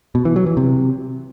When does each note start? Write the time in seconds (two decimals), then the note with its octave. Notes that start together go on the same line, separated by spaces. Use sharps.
0.15 B2
0.25 E3
0.36 F#3
0.46 E3
0.57 C3